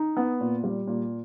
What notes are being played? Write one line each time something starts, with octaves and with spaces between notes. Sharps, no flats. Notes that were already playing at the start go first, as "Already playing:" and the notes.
Already playing: D#4
B3
A#2
G3
A#2